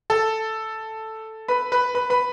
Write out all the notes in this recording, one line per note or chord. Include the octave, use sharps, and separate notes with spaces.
A4 A5
B4 B5
B4 B5
B4 B5
B4 B5